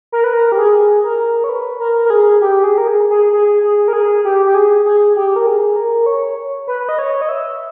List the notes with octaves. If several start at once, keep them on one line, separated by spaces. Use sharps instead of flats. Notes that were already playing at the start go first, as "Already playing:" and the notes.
A#4
B4
A#4
G4
G#4
A#4
C#5
B4
A#4
A#4
G#4
G4
G#4
A#4
G#4
G#4
G#4
G#4
A#4
G#4
G4
G4
G#4
G#4
G4
A#4
G#4
A#4
C#5
B4
D#5
C#5
D#5
E5